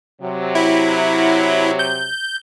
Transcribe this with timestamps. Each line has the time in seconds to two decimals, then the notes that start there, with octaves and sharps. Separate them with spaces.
0.22 C3 F#3
0.55 E4
1.79 G6